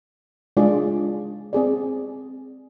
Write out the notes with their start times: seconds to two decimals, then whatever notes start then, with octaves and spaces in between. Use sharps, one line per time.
0.57 G#3 D4 F4 G#4 D5
1.53 C4 G#4 D5